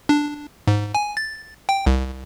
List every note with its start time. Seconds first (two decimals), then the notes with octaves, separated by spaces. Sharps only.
0.09 D4
0.67 G#2
0.95 G#5
1.17 A6
1.69 G5
1.86 C2